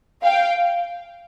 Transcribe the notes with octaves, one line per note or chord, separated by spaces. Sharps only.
F5 G5